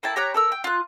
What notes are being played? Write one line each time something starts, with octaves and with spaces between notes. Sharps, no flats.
A#3 E4 G5 A5
G4 C#5 A#5 F#6
A4 A#4 E6
G5
F4 F#6